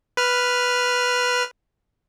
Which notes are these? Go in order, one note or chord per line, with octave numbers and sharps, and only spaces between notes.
B4 F6